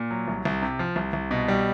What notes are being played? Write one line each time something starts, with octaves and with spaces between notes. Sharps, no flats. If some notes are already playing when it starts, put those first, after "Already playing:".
Already playing: A#2
F#3
C2
C2
C3
F3
C2
C2
B2
G3